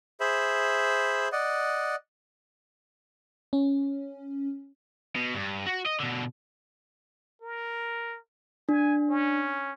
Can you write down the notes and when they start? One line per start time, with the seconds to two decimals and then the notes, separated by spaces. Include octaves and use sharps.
0.20 G#4 C5 E5 B5
1.32 D5 D#5 F#5
3.53 C#4
5.16 B2
5.35 G2
5.67 F#4
5.86 D#5
6.00 B2 D3
7.42 A#4
8.69 D4 G#5
9.09 C#4